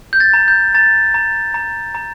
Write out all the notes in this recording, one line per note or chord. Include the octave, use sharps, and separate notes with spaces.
G6
A6
A#5
G6
A#5 A6
A#5
A#5
A#5